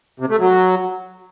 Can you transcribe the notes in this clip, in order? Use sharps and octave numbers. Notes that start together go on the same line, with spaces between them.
C3
A3
F#3